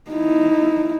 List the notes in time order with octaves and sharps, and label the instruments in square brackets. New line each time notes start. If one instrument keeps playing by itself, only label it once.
[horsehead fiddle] D#4 E4